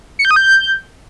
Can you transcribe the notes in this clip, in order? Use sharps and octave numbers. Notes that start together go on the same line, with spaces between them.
C#7
G6
D#6
G6